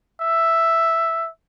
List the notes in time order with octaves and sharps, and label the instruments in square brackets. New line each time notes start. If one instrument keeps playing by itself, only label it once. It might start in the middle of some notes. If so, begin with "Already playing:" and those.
[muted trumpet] E5